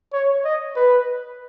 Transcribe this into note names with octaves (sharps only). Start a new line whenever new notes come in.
C#5
D#5
B4